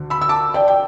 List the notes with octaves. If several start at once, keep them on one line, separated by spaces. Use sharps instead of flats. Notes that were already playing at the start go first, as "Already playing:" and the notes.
Already playing: D2 D3
B5 E6
E6
A5 D6
D5 G5
G5